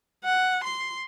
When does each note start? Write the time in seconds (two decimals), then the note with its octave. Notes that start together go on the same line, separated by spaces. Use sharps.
0.24 F#5
0.64 C6